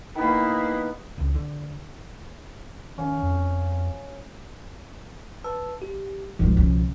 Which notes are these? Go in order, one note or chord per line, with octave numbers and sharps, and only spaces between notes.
D#3 A#3 B3 E4
C#2
D3
D#3 C#4 F5
F2
B4 A5 E6
G4
C2 G#2 B2 F3 G#3
C#3